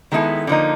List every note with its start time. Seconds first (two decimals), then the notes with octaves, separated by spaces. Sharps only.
0.12 D#3 G#3 B3 E4 A4
0.47 D3 F3 A#3 D#4